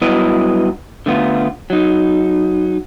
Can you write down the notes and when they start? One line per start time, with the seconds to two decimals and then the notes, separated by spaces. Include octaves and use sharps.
0.02 G2 F#3 B3 E4 B4 D#5
1.06 D3 A3 B3 F4
1.70 F#3 D#4